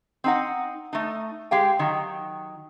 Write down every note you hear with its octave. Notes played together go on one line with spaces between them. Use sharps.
C4 D#4 F#5
A3 D#4
G#3 G4 F5 G5
D#3 F#3